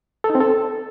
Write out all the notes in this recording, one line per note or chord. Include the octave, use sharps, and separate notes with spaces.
A4
D#4
C4
A4